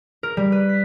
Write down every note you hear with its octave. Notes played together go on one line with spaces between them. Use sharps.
A#4
G3
B4
B6